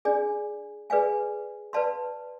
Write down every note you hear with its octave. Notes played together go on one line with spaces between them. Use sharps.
D4 G#4 D5 G#5
G#4 B4 D5 F5 G#5
B4 D5 F5 A5 C6